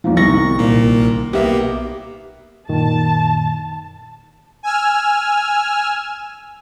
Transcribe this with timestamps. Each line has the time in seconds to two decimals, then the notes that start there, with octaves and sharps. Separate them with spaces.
0.04 E2 G#2 F3
0.17 C2 D#3 C#6 A#6
0.59 A#1 A#2 A#3
1.33 B1 A#3 B3 G4 E5
2.69 F#2 A#2 D#3 A5
4.63 G#5 E6 F6